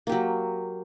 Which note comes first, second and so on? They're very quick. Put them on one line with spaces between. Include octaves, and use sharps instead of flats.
A#3 G4 F#3